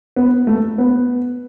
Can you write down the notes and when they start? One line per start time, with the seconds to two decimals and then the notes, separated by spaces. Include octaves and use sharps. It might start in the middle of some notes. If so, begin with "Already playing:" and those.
0.16 B3
0.47 A3
0.78 B3